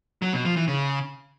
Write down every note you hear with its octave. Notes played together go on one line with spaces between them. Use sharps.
F#3
B2
F3
E3
C#3